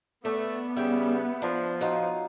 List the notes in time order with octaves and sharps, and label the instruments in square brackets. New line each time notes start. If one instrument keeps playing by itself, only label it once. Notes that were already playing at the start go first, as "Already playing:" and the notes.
[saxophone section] A3 [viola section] B3 [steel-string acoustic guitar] D4
[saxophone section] C#3 G3 [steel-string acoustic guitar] E5 G5
[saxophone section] F3 [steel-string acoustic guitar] D4
[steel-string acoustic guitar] F#3 D#4 F4